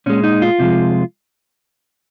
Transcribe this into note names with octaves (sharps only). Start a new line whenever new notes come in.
A#2 G#3 C#4
D#4
F4
C3 F3 G#3